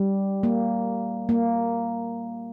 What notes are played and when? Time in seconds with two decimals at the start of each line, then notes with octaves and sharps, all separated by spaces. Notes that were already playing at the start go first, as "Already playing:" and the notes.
Already playing: G3
0.43 A#3
1.29 A#3